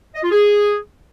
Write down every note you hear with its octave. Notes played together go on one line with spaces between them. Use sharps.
D#5
F4
G#4